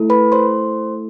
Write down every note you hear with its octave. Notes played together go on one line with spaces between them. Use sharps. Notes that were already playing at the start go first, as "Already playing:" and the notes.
Already playing: A3 E4 A4
B4 B5
C5 C6